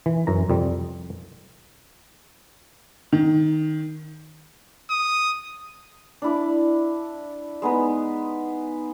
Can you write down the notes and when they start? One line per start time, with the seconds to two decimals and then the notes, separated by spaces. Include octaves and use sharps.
0.06 E3
0.27 F#2 E3 A#5
0.49 C2 F2 G3
3.12 D#3
4.90 D#6
6.22 D4 E4 D6
7.62 G#3 B3 D#4 B4